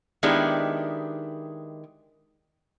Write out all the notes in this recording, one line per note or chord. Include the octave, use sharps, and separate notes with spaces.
D#3 G#3 B3 D4 E4 G4